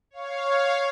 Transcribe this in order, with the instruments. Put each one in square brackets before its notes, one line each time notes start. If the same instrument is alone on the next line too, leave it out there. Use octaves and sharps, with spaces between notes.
[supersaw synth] C#5 F5